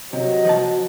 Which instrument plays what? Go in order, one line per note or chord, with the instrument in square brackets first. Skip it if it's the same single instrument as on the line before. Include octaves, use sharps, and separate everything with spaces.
[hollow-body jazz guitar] C3 [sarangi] F#3 [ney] D#5
[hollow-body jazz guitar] F3 F#4 A5